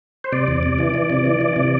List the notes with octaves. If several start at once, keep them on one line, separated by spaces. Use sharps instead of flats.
C5
C3 D5
E2
C3
E3
E3
C3
E3
E3
C3